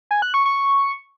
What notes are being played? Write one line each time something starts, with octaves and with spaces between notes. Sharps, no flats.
G#5
F#6
C#6
C#6